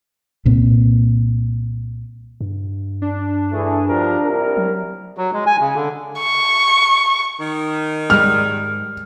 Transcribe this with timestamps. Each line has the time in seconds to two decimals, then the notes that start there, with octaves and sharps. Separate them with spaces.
0.45 C2 A#2 C4
2.41 G2
3.02 D4
3.52 E3 A3 G#4
3.86 F3 G3 A#4
4.24 C2 A#4
4.57 F#3
5.17 F#3
5.33 G#3
5.47 G#5
5.60 C#3
5.75 D3
6.19 C#6
7.39 D#3
8.10 G#2 G3 G#3 F6